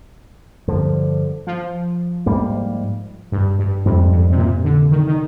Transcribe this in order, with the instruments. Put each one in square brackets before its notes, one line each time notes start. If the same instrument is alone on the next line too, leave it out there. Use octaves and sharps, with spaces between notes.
[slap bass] G2 D3 F3
[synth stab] F3
[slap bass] G#2 G3 A#3
[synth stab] G2
G2
[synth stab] F2 [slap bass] G#2 G3 C4
[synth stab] F2
C3
A#2
D3
D#3
D#3